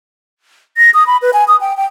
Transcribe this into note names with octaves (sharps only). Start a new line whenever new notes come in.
A#6
D#6
B5
B4
G#5
D#6
G5
G5